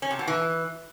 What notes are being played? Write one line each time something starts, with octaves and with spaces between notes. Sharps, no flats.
C#4
C3
B2
E3